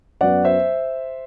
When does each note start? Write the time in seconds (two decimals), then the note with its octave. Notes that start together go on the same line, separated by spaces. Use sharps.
0.21 F#2 F#3 B3 D5 F#5
0.45 C5 E5